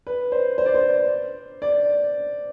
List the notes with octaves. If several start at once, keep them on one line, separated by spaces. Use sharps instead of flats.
B4
C5
C5
D5
C5
D5